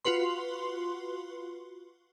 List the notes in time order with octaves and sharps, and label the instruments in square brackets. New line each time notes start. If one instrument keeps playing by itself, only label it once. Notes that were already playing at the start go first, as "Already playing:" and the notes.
[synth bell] F4 F#4 B4 C6